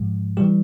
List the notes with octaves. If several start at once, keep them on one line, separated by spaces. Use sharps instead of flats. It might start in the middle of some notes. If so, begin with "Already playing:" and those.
Already playing: G#2 F3 G#3
E3 G3 G4